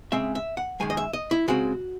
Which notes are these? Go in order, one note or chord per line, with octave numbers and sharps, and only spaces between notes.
C#3 G#3 C4 E5
E5
F#5
F#2 D#3 G#3 G#5
D#5
E5
D#5
E4
C#3 G#3 C4 F#4